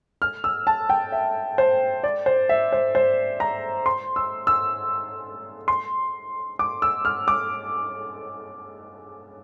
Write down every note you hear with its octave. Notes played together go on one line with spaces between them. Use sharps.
F6
E6
A5
G5
E5
C5
D5
C5
E5
C5
C5
A#5
C6
E6
E6
C6
D6
E6
F6
D6